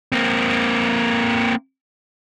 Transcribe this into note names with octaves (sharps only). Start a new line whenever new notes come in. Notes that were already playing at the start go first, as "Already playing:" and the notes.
A#3 C4